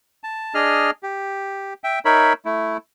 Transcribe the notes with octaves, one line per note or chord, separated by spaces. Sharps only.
A5
D4 G#4 D#5 F6
G4
E5 G5
D#4 A#4 C#5 E5 B5
A3 E4